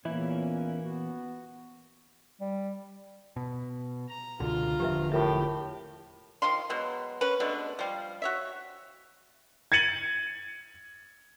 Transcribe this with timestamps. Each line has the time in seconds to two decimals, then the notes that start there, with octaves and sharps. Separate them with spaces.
0.05 E2 A#2 E3 A#3 C#4 E4
0.82 B3 F#4
2.41 G3
3.36 B2
4.09 A#5
4.40 C#2 B2 D3 F4 A#5
4.80 E1 D3 F3 G4 B4 E5
5.12 A2 F4 G4 A#4 E5
6.42 D#3 F3 F5 C6
6.70 B2 F#3 G#3
7.21 C#4 B4
7.40 B2 G#3 A3 D4
7.79 F3 G3 F5
8.22 F#4 C#5 E5
9.72 G#6 A6 C#7 D#7 F#7